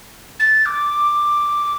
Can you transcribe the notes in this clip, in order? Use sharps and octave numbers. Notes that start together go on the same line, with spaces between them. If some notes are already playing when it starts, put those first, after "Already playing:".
A6
D6